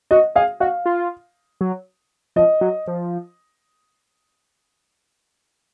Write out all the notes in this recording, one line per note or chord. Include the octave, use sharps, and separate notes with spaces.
F#4 D#5
G#4 F5
F#4 F5
F4
F#3
F3 D#5
F#3
F3